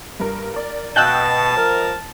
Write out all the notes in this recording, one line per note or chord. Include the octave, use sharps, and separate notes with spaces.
G2 A#4
A#4 D5
B2 D#5 F5 G5 A5 E6 F#6 G6
F3 A#4